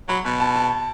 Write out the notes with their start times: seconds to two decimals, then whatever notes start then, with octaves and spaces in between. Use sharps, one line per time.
0.08 F#3 B5
0.25 B2 B5
0.40 A5
0.56 A5